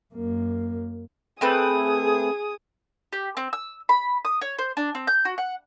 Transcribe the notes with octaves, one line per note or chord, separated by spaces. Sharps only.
F#2 A#3
A3 C4 G#4 B4 D#6
G4
C4
E6
B5
D#6
C#5
C5
D4
C4
G6
F#4
F#5